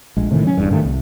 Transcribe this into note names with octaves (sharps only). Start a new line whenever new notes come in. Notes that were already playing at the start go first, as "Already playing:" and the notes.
A#1 G#3
A2 C3 D#3 E3
F#3 C#4
G1 E2 G2
G2 D3 D#3 A3
C2